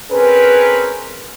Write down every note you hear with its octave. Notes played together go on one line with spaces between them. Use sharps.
C4 C#4 G#4 A#4 B4